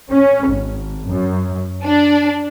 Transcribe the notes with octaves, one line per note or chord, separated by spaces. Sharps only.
C#4
G#1
F#2
D4